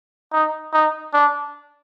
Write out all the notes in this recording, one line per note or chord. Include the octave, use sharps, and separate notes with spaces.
D#4
D#4
D4